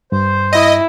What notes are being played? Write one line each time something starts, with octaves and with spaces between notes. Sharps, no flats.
G2 C5
E4 D#5